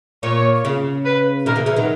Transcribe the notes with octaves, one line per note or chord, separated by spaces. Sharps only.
A#2 C#5
C#3
B4
B2 D#3 A#4
C#3 E3
C#3 E3
D#3 F#3